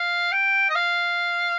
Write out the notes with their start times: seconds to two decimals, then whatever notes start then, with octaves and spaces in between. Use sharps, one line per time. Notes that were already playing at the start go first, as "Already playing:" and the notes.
Already playing: F5
0.32 G5
0.69 D#5
0.75 F5